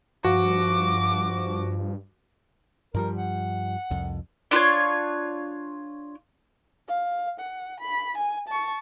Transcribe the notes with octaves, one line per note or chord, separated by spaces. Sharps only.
G2 F3 F#4 D6
G2 F3 G3 A#4
F#5
C2 F2
D4 F4 B4 C#5
F5
F#5
B5
G#5
A5 C#6